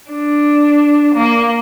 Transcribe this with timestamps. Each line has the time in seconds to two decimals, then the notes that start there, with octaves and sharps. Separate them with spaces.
0.12 D4
1.15 A#3